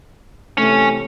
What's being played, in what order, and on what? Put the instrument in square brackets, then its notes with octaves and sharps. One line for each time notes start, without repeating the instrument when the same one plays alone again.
[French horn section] C3 E3 A3 [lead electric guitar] C#4